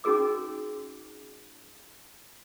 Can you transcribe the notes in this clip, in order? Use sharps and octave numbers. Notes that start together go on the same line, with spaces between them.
C#4 D#4 F#4 G#4 A#4 D6